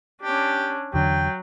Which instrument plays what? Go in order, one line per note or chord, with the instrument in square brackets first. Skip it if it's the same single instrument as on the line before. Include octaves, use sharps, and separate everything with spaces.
[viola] C#4 D4 [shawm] G4
[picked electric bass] E2 D3 [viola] F#3 [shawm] G5